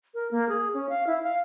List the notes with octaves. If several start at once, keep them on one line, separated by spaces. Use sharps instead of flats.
A#4
A#3
G#4
C#4
F5
E4
F5